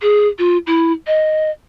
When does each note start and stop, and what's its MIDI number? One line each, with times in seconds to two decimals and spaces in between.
0.02 0.28 68
0.39 0.58 65
0.67 0.92 64
1.07 1.50 75